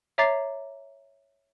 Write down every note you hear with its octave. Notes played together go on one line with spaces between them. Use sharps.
C#5 E5 A#5 D6 A6 C7